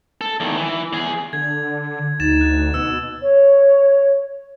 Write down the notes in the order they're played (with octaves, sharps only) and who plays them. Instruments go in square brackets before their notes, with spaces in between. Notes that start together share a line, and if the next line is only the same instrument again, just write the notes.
[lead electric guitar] A4
E2 D#3
E3
E2 G#4
[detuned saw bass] D3 [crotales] G#6
[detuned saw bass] D2 [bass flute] D#4 [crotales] A6 E7
[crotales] F#6
[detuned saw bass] B2 [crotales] E6
[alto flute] C#5